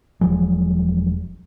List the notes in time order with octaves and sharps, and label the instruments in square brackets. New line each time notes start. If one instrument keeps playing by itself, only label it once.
[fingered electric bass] E1 F3 F#3 G#3